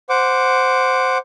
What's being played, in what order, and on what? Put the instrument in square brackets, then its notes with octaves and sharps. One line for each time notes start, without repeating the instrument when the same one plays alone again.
[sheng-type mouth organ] C5 F#5 D6